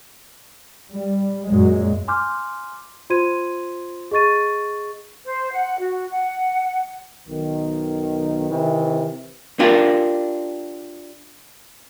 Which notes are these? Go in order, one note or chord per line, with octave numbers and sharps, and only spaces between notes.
G3
F#2 A#2 F#3 G#3
G#5 C6 D6 F6 G6
F4 C5 C6 G#6 D#7
G#4 D#5 C#6 A6 D#7
C5
F#5
F#4
F#5
B1 D#3
C3 D#3 E3
D4 F4 G4 A#4